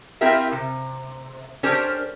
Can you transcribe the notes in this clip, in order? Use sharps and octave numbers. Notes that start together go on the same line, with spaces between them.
C4 E4 F4 G4 A#4 E5
C3
C#4 D4 G4 A4 A#4 C5